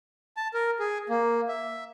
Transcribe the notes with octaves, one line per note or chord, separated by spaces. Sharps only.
A5
A#4
G#4
A#3
E5